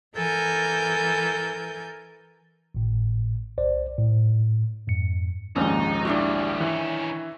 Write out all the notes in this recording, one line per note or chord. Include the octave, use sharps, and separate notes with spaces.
E3 A4 A#4 G#5 G6
G#1 A2
B1 C5 D5
A2
F2 G#2 C#7
A#1 D#2 G#2 C#4 D#4
F#3 G3 D4 E4 F#4
D#3 E3 C#4